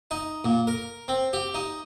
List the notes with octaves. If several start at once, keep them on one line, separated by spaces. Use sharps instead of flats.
D#4
A#2
A#4
C4
G4
D#4